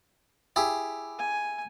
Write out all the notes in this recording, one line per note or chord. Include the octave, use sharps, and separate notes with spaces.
E4 G4 G#4
G#5